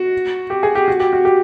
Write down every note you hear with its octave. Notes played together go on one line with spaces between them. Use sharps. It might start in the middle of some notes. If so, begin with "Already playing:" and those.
Already playing: F#4
G4
G#4
G4
F#4
G4
F#4
G4